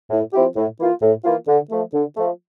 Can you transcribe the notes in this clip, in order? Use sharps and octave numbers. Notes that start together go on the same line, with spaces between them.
A2
F3 C4 E4 G4
A2
E3 A#3 F4
A2
E3 A#3 F4
D3
F3 A3
D3
F3 A3